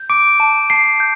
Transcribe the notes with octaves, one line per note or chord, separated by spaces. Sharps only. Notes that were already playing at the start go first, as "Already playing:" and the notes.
Already playing: G6
D6 D7
A5
A5 C7
G6